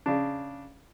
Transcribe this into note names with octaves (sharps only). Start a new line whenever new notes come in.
C#3 D4